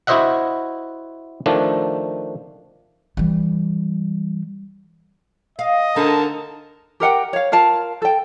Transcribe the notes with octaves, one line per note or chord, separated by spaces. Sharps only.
E4 F#4 C5 D#5 E5 F#5
D#3 F3 A3 D4
E3 G3
D#5 F5
D3 D#4 A#4 A5
G4 A#4 F#5 G5
C#5 F5
F4 A#4 F5 A5
A4 G5